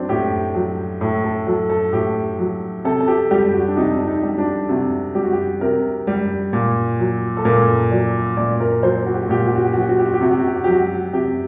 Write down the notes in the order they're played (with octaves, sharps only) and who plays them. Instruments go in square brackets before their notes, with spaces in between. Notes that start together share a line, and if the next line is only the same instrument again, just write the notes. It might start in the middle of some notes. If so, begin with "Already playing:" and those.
Already playing: [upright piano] F#3 C4 D4
A2 G4
F#3
A2 A4
A4
F#3 A4
A4
A2 G4
F#3
C3 A4
A4
G4
G3 G4
F#4
D4
C3 D#4
D4
D#4
G3
D4
C3 F#4
G3 G4
F#4
G4
C3 A#4
G3
A#2
F#3
A4
A#2 A#4
F#3 D5
A#2 D5
A#4
F#3 C5
F#4
G4
F#4
A#2 G4
F#4
G4
F#4
G4
F#3 F#4
G4
F#4
G4
F#4
G4
C3 F#4
G4
F#4
G4
F#4
G4
F#3 F#4
C3 G4